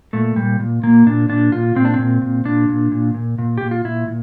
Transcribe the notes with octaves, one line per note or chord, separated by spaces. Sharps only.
A#2 A3
A#2 G3
A#2
A#2 A#3
A#2 D4
A#2 D4
A#2 F4
A#2 C4
D4
C4
A#2
A#2
A#2 D4
A#2
A#2
A#2
A#2
A#2 G4
F4
A#2 E4
A#2